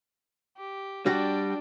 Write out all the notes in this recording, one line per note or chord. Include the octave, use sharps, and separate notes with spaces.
G4
G3 D4 F#4 G5